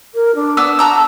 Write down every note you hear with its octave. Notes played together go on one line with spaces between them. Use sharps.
A#4
D4
B3 E6 F6
F#4 A5 A#5 E6